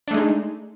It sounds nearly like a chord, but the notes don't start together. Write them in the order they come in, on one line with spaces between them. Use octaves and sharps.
D4 A3 G#3 D#4